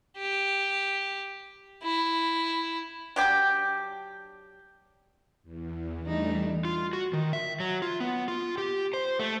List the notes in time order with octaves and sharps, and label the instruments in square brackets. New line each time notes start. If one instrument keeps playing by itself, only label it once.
[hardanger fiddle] G4
E4
[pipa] F#3 D4 G4
[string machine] E2
[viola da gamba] E3 D#4 [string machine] G3 A3 D4
[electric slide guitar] F4
F#4
D#3
E5
F#3
F4
B3
F4
G4
C5
A3